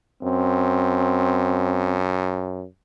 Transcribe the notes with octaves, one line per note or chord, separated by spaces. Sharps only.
F#2 C4